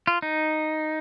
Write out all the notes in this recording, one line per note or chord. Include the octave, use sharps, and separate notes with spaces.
F4
D#4